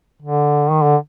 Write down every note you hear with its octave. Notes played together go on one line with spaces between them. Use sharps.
D3
D#3
D3